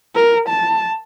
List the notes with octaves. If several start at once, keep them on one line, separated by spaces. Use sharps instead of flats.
A#4
A5